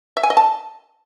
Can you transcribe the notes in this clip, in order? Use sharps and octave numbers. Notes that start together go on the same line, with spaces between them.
E5
G#5
D#5
A5